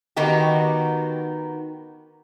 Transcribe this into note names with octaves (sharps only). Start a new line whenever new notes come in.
D#3 B3 D#4 F#4 G4